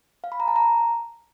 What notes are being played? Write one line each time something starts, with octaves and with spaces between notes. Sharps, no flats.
F5
B5
A#5
A5
A#5